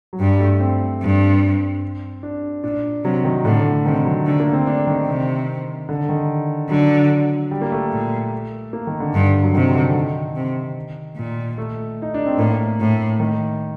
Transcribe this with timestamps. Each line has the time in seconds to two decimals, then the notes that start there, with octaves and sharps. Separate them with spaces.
0.13 F#3
0.20 G2 G3
0.40 A3
0.60 C4
1.02 G2
2.23 D4
2.64 A#2 D4
3.04 C3 F#3
3.24 D#3
3.45 A2 D3
3.85 C3 D#3
4.05 F#3
4.26 D3 A3
4.40 A#3
4.53 C4
4.66 D3 D4
4.87 D#3
5.07 C3
5.89 D3
6.09 D#3
6.70 D3 F#3
7.51 G3
7.61 A#3
7.72 A3
7.92 A#2
8.73 A#3
8.87 D#3
9.00 D3
9.14 G2
9.43 F#3
9.54 C3 D#3
9.75 D3
9.95 D#3
10.36 C3
11.17 A#2
11.58 A3
12.02 D#4
12.14 D4
12.27 C4
12.38 A2 A#3
12.80 A2
13.20 D#3